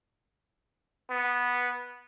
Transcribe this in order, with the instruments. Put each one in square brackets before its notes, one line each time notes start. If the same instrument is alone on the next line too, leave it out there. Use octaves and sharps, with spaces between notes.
[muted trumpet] B3